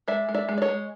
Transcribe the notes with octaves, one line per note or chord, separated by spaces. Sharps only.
G#3 D5 E5
G#3
D5 E5
G#3
D5
C#5 D#5
G#3